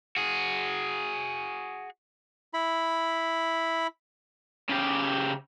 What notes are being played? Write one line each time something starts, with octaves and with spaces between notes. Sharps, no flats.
F#4 G#4
E4 B5
C#3 G4